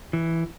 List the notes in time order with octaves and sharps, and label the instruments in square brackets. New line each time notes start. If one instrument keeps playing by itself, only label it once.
[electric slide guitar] E3